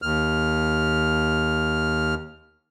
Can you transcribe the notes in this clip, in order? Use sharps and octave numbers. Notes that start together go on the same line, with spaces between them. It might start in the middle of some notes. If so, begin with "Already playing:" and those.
D#2 F6